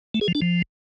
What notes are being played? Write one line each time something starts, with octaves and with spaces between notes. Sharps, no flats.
A3
G#4
F3
D4
F3